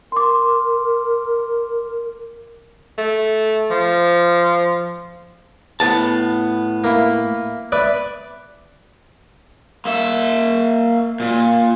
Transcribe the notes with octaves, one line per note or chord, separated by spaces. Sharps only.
A#4 C6 D6
A3
F3
A2 B3 A5
A#3 E4
B4 D5 E5
A#3 E5
A#2